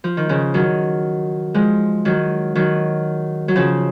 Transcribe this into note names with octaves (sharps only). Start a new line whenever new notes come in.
F3
D#3
C#3 F3
D#3 F#3
F3 G#3
D#3 F#3
D#3 F#3
F#3
C#3 F3